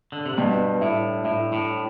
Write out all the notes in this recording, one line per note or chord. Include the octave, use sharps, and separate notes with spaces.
D3
C3
G2 B2
A2 E4
A2 E4
A2